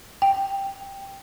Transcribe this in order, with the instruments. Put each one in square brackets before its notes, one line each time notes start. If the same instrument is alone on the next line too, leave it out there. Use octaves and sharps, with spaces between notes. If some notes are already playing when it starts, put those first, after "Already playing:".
[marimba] G5